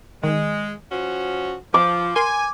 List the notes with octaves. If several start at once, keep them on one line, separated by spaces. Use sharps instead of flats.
D#3 G#3
F3 C#4 F#4
F3 D6
A#4 G#5 C6